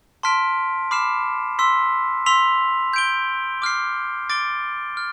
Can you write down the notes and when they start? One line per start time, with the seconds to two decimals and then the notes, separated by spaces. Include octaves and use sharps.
0.23 A5 C6 F6 B6 D7
0.91 B5 D6 F6 C7 E7
1.59 C6 E6 B6
2.26 C6 E6 B6 F7
2.93 G6 D7 G7
3.62 D6 F6 C7
4.30 D6 A6 D7 G7
4.97 F6